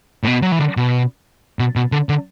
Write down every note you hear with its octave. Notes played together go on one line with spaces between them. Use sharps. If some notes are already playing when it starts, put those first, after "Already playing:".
A2
B2
F#3
E3
D3
B2
B2
B2
D3
D3